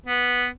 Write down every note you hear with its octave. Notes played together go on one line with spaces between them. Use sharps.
B3